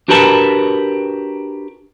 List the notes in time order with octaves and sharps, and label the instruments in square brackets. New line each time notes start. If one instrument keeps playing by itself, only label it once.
[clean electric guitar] D4 F#4 G4 A#4 B4 A5